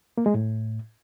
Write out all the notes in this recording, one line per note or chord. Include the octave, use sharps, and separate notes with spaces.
A#3
G#3
A2